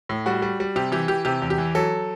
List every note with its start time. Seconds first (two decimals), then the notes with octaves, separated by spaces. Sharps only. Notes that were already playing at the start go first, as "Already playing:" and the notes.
0.09 A2
0.26 G3 F#4
0.42 G3
0.60 G3
0.76 C3 G4
0.92 E3 G4
1.08 E3 G4
1.25 C3 G4
1.42 E2
1.50 G4
1.58 E3
1.75 F#3 A4